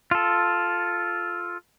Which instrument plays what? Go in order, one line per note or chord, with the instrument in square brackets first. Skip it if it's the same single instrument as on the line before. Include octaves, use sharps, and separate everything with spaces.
[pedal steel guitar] F4 A4